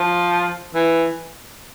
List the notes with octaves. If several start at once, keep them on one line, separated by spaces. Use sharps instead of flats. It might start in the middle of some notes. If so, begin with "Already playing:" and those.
Already playing: F3
E3